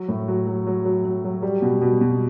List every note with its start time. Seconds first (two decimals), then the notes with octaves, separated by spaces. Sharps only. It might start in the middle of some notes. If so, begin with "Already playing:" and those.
Already playing: F#3 F#4
0.08 A2
0.28 F#3
0.47 F#3
0.67 F#3
0.85 F#3
1.05 F#3
1.24 F#3
1.42 G3
1.62 B2
1.81 B2
2.01 B2